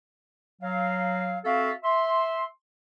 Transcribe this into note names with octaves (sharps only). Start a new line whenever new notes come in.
F#3 F5
C4 F#4 A4 E5 F5
E5 C6